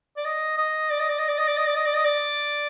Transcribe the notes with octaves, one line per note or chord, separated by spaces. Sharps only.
D5
D#5
D#5
D5
D#5
D5
D#5
D5
D#5
D5
D#5
D5
D#5
D5
D#5
D5